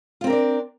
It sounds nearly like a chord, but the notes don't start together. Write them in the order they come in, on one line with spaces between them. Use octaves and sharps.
F4 C4 A#4 D4 D5